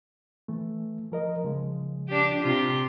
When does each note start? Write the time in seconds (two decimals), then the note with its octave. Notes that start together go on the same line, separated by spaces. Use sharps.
0.48 E3 A3
1.12 F3 A#4 D#5
1.44 C#3 F3 G#3
2.08 D4 G4
2.40 C3 F4 G4